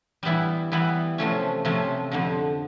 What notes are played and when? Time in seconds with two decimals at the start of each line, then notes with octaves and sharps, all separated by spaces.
0.23 E3 G3 B3 E4
0.72 E3 G3 B3 E4
1.18 C3 F3 A3 C#4
1.65 C3 F3 A3 C#4
2.11 F2 D3 F3